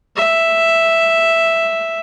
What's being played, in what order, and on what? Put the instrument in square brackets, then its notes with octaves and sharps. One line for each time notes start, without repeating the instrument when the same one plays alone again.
[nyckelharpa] E5